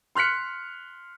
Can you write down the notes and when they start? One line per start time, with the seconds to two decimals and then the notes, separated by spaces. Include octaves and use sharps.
0.15 C6 F6 F#6 B6 C#7